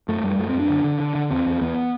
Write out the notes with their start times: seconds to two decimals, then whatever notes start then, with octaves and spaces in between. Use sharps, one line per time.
0.08 F#2 A3
0.23 F#2 G3
0.38 F#2 A3
0.49 C4
0.54 F#2
0.59 D4
0.70 D3
0.84 D3
1.00 D3
1.15 D3
1.30 E2 C4
1.46 E2
1.61 E2 B3